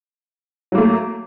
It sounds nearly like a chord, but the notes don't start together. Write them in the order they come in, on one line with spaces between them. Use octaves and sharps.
F#3 A#3 A3